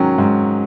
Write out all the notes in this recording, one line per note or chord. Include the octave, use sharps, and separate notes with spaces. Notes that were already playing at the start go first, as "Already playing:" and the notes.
Already playing: G#2 D#3 F#3 C#4
G#2